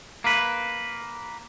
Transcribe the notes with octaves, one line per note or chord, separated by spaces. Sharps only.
A#3 B4